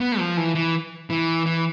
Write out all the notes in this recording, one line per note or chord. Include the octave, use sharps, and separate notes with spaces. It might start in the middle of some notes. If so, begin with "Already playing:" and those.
B3
F3
E3
E3
E3
E3